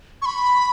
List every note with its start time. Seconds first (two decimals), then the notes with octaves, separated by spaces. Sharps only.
0.22 C#6
0.26 B5